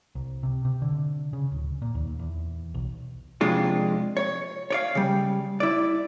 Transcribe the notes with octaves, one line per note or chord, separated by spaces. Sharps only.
C2
C3
C3
D3
C#3
D1
A#2
D#2
E2
B1
F2 C3 G#3 D4 F4
C#5
C#5 D5 F5
C#3 G3
E4 D5